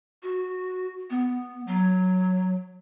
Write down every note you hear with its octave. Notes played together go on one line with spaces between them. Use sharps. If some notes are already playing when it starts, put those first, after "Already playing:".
F#4
B3
F#3